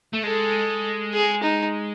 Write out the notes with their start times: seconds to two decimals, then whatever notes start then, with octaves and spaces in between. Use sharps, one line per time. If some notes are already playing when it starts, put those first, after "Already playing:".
0.13 A3
0.23 G#3 A4
1.14 G#4
1.43 D#4